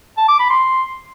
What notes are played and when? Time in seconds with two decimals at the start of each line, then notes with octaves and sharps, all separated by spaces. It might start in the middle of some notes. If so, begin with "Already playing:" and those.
0.17 A5
0.28 D6
0.39 B5
0.50 C6